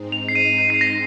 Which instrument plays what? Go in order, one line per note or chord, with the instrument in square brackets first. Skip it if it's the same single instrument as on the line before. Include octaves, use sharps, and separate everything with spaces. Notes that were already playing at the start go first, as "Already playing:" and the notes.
Already playing: [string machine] G#2 G#3 C4 D#4
[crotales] F7
C7
D#7
D#7
C7
A#6